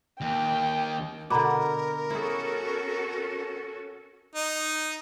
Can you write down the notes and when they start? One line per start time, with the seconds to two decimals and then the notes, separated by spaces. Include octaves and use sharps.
0.21 D#2 G5
1.30 B2 D3 A#4 A#5 B5 D6
2.10 C#4 E4 F#4 G#4 A4
4.35 D#4